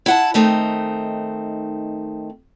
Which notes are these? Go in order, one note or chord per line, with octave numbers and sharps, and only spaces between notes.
E4 F#5 A5
D#3 A3 C4 D#4